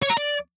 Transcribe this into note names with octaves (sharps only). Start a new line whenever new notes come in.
C#5
A#5
D5